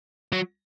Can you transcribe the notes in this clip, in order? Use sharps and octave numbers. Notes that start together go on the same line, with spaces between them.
F#3